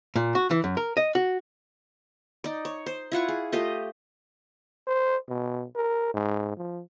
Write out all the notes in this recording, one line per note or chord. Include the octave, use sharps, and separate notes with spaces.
A#2
F#4
E3
F#2
A#4
D#5
F#4
D#4 D5
C#5
C5
E4 F4 F#5 C#6
G#4
A3 F4 G4 D#5
C5
B2
A#4
G#2
F3